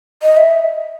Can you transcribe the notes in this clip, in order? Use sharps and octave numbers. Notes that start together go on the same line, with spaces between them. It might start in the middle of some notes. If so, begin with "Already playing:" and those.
D#5
E5